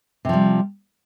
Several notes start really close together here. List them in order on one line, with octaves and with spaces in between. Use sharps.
C3 F3 G3